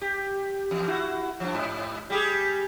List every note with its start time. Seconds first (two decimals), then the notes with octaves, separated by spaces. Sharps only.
0.01 G4
0.71 E2
0.88 E4 F#4
1.40 G2 F3
1.55 G#2
2.10 G3 G4 G#4